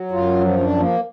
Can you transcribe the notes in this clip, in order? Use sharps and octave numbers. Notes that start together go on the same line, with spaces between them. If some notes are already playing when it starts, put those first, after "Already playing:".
Already playing: F#3
F#2 F4
F3
D4
F3
A#3